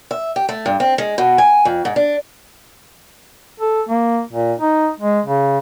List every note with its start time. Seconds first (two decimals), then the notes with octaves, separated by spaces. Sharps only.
0.11 E5
0.36 G4
0.49 A3
0.66 G2
0.80 C4
0.98 G#3
1.18 B2
1.38 G#5
1.65 F2
1.85 G#2
1.96 D4
3.60 A4
3.89 A#3
4.33 A#2
4.58 D#4
5.01 G#3
5.26 C#3